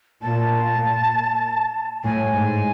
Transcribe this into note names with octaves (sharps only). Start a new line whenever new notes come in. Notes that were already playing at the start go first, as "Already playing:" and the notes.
A#2 A5
A2 G#5
G#2